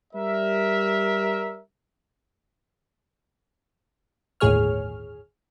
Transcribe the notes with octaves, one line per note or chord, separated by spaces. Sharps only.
G3 A#4 E5
G1 D#2 A2 G#4 C#5 F6